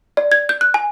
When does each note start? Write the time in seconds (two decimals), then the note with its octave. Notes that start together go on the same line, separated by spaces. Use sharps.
0.17 D5
0.32 G#6
0.49 G6
0.61 F#6
0.74 G#5